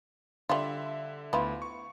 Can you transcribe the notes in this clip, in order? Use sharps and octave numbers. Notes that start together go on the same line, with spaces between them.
D3 G3 F4 E5
D2 B3 E4 F4
C#6